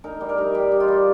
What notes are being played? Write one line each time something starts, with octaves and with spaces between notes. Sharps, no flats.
D#4 A#4
G3
A#4
D#4
G3 G4
D#4
F4
G3